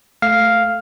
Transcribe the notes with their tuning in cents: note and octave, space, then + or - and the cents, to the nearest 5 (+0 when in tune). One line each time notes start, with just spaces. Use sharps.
A3 +0 F5 +0